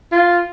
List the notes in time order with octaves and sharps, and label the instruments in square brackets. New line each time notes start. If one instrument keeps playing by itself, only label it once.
[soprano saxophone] F4